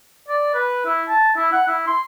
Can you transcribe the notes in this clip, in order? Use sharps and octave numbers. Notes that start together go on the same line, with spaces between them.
D5
B4
E4
A5
E4
F#5
E4
C6